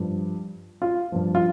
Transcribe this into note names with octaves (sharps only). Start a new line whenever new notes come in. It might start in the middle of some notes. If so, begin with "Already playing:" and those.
Already playing: G2 F3
F4
G2 F3
F4